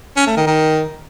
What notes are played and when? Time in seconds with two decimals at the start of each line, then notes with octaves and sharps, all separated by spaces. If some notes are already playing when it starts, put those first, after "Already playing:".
0.16 C#4
0.27 A3
0.37 D#3
0.47 D#3